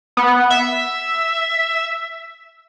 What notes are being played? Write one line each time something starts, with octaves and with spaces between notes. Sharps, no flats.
B3
E5